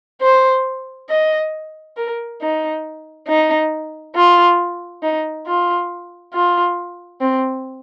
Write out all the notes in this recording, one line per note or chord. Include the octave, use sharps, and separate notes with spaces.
C5
D#5
A#4
D#4
D#4
F4
D#4
F4
F4
C4